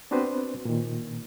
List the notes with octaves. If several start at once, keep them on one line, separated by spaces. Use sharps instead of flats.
B3 C4 D4 F#4 B4 C5
A#2 D#3